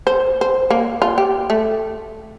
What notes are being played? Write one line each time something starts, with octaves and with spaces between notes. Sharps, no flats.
C5
C5
A#3
F4
G4
A3